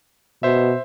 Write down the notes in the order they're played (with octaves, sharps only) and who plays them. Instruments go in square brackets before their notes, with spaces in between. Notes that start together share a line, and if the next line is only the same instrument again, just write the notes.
[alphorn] B2 [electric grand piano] C5 E5